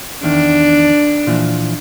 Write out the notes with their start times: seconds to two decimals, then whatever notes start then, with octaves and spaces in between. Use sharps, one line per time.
0.23 E2 D#3 D4
1.27 A#2 E3 F3